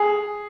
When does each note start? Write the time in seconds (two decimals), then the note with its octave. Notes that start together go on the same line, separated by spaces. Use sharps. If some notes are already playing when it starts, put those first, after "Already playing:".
Already playing: G#4